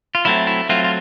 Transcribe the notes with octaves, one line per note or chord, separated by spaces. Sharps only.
F4
F#3 A3 C4 E4
E4
F#3 A3 C4 F4
F4